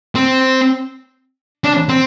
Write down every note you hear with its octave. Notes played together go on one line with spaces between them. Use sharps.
C4
D4
C4